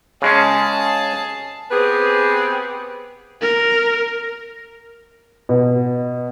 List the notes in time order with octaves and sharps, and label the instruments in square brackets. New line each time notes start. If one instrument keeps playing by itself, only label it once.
[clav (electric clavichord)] C#3 G#3 C#4 [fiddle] G#4 A5
[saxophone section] B3 C4 G4 G#4 B4
[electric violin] A#4
[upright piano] B2